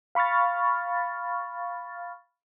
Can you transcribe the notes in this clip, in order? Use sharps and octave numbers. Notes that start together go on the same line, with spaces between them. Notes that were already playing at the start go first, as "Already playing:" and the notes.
F5 B5 C#6 F6 A6